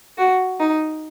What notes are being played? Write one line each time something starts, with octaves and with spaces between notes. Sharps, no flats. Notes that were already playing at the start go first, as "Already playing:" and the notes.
F#4
D#4